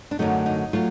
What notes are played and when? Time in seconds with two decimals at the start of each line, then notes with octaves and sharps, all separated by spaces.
0.11 D4
0.19 F#2 D3 F#3 A3 D#4
0.46 D#4
0.73 F#3 A3 F4